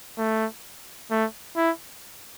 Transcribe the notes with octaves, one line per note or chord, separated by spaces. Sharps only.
A3
A3
E4